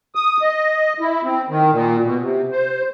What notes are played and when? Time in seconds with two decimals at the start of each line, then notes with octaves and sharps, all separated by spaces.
0.15 D#6
0.42 D#5
1.00 E4
1.24 C4
1.49 D#3
1.71 A#2
2.03 B2
2.21 C3
2.52 C5